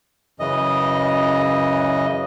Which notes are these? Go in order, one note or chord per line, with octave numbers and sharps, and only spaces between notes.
F#2 C#3 E3 D#5